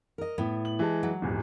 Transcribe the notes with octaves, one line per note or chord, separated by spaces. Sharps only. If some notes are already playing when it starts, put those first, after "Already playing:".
A#4 D#5
A2 B3
F#7
E3 G#3 A5
F#3
D#1 G#1 E2